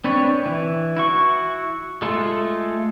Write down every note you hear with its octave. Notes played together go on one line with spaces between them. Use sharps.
C4 D4 B4 C#5
E3
E4 F#4 C#6
G#3 A3 F4 A4 C6